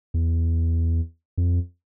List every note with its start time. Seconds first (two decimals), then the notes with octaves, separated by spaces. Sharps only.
0.14 E2
1.38 F2